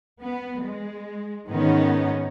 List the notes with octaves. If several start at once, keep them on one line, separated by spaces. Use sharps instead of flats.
B3
G#3
G#2 D#3 B3 C#4 D#4